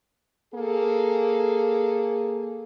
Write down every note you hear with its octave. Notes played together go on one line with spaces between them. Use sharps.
A#3 G#4 A4